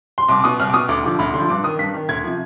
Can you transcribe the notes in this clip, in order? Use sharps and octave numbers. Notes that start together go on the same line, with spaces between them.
C6
C2 D6
D6
B2 D#6
C2 F6
D6
B2 D#6
D2 D6
D3 F3 D6
D2 B5
D3 F3 C6
G2 D6
D#3 D#6
G2 B6
D#3
D2 G#6
C3 F3